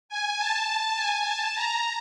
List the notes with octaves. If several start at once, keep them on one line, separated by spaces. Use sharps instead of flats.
G#5
A5
G#5
A5
A#5